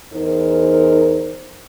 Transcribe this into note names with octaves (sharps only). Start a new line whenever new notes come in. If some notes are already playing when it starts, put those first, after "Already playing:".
E2 D#4 A#4 C5